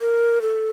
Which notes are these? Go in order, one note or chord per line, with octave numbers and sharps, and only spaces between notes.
A#4
A4